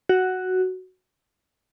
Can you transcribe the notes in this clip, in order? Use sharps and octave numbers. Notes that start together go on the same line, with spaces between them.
F#4